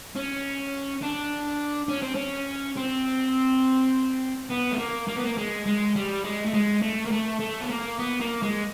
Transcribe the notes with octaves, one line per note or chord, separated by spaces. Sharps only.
C#4
D4
C#4
C4
C#4
C4
B3
A3
A#3
A#3
B3
A#3
G#3
G#3
G3
G#3
A3
G#3
A3
A#3
A3
A3
B3
A#3
B3
A#3
G#3